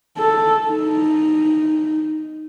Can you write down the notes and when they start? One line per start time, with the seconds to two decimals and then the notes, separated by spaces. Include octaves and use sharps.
0.18 A4
0.67 D#4